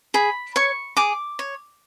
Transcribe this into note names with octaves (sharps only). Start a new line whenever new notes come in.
G#4 B5
C#5 C#6
G#4 D6
C#5